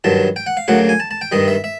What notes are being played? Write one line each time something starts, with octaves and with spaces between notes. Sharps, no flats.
G2 D#3 F#3 A5
G5
F#5
F5
D2 C#3 F#3 A#3 F#5
G#5
A5
A5
G5
G2 D#3 G3 D#5
E5
E5